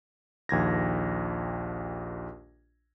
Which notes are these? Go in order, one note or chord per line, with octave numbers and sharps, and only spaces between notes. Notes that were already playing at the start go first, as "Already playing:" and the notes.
A#1 D#2 G#6 A#6